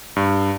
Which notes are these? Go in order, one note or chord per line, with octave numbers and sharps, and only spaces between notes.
G2